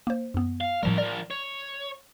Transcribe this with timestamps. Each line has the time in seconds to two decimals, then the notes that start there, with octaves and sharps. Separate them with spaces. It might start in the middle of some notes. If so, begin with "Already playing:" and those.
0.07 A#3 C5
0.34 F#2 B3
0.61 F5
0.83 A2 F3 G3 C4 A#4
0.98 F3 A#4 D5
1.31 C#5